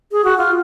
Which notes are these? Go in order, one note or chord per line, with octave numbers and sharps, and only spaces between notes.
G#4
F#4
F4